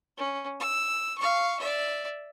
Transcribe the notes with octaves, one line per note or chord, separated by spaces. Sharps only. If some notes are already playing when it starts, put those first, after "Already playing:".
C#4
E6
F5 C#6
D5 E5